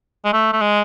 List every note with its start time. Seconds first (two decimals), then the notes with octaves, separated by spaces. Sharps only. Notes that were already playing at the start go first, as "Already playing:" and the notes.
0.25 G#3
0.33 A3
0.53 A3
0.61 G#3